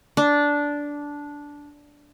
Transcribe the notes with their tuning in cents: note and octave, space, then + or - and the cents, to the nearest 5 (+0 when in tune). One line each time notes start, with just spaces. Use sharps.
D4 -10